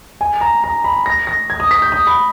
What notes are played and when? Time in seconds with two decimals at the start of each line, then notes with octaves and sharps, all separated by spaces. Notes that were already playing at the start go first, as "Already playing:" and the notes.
0.21 G#5
0.41 A#5
0.64 A#5
0.84 B5
1.06 A#6
1.27 A#6
1.50 G#6
1.60 D#6
1.71 B6
1.82 G6
1.92 D#6
2.07 B5